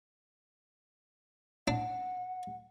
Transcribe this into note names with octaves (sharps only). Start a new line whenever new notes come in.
D4 F#5